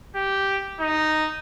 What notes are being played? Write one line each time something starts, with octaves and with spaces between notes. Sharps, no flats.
G4
D#4